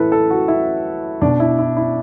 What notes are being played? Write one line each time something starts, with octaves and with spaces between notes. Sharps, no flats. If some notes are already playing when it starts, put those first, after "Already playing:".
Already playing: A2 E3 A4 B4
A4
F#4
E4
B2 D4
E4
E4
E4